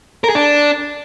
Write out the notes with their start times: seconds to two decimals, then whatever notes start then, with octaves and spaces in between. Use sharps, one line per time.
0.24 A#4
0.29 G#4
0.35 D4